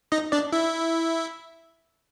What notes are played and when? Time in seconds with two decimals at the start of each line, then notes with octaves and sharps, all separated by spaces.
0.12 D#4 D#5
0.32 D4 D5
0.53 E4 E5